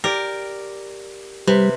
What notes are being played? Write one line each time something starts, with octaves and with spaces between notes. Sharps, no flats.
G4 A#4 D5
C3 G3 B4